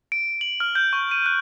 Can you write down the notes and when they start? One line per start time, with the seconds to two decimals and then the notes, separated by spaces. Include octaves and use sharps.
0.12 D7
0.41 F#7
0.60 F6
0.75 G6
0.93 C#6
1.11 D#7
1.26 F#6